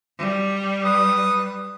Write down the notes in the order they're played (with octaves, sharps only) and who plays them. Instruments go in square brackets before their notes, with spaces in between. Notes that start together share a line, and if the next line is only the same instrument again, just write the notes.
[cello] G3
[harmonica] B4 D#6